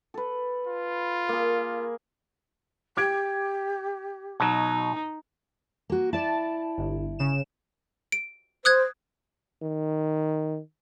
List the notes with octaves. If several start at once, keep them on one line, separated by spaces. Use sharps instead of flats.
A4 B4
F4
A#3 G#4
G4 D6 G#6 D7
B2 F#3 D#4
A#3 F#4
E4 D5 A5
G1
C#3 E7
D7
C5 D#6 F#6 G#6
D#3